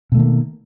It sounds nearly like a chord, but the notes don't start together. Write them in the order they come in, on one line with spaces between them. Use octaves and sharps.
B2 A3 D#3 A#3